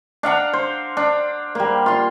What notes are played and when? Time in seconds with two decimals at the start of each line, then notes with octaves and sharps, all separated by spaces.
0.23 D4 F5 F#5 A#5
0.53 C5
0.97 D4
1.55 G3 A#3
1.86 F4 C6